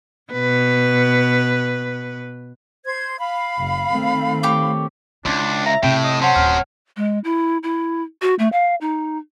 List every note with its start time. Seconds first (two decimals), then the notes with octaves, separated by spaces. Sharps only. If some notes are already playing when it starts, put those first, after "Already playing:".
0.32 B2 B4
2.85 C5 G#6
3.19 F5 B5
3.59 F#1
3.91 D#3 A3 C4
4.43 G4 C#5 D6
5.25 C#2 C#4 D4 E4
5.66 E5 A#5
5.83 A2 C3 G5
6.04 D#5
6.22 F#3 C#4 C5 F#5 A5
6.36 D1 F6
6.97 G#3
7.24 E4
7.63 E4
8.22 F#4
8.39 A3
8.52 F5
8.81 D#4